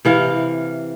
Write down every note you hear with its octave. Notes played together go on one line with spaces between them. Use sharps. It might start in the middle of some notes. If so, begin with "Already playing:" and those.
C3 E3 F5